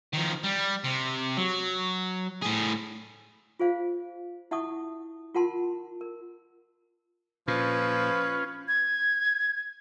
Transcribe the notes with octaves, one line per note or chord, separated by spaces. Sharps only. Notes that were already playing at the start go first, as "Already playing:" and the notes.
D#3 F3
G3
C3
F#3
A2 G#4
F4 G#4 C5 F5
E4 E5 F#5 A5 C#6 D#6
F4 A#4 F#5 A5 C6
A#4
A#2 F3 C#4 F4 B4
G#6